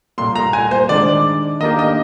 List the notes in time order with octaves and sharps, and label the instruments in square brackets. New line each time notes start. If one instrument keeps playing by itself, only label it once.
[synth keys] A#2 G3 A#3 [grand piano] C6
[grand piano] A#5
G#5
C5
[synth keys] D#3 G#3 D4 [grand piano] D5
[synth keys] D#3 A#3 D4 G4 [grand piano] D#5
[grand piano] D#5